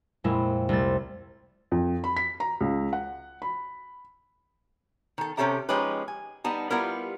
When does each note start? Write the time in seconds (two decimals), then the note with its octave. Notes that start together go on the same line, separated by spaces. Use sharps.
0.24 F2 A#2 G#3 E4
0.69 C2 A3 A6
1.72 F2
2.04 B5
2.17 B6
2.40 A#5
2.60 C#2
2.93 F#5
3.42 B5
5.18 D#3 A4
5.37 C3 C#4 G4 A4 E5 A#5
5.69 F3 G#3 C#4 D#4 G4 B4
6.08 G#5
6.44 G3 B3 D#4 A5
6.71 G3 B3 E4 F4 G4 A#4